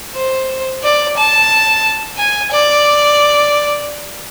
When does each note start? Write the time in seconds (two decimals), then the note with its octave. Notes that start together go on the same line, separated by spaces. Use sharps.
0.15 C5
0.83 D5
1.17 A5
2.18 G#5
2.52 D5